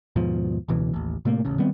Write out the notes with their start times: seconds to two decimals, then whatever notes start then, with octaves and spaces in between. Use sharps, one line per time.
0.16 D#2 G#2 B2 F3
0.68 D1 C#2 B2 E3
0.93 A1 D#2
1.25 A2 C3 A3 A#3
1.45 D#1 A1 C#3
1.58 D#3 G3 B3 C4